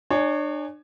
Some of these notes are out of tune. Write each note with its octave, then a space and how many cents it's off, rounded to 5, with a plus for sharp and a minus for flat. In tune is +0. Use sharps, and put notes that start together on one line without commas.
D4 +35 C#5 +0 G#5 +0